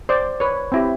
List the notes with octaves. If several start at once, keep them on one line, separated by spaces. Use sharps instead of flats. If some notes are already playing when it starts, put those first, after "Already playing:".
C5 D5
B4 C#5
C4 E4 G4